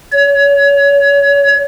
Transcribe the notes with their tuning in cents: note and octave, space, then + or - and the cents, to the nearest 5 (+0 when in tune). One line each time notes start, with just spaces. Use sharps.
C#5 +30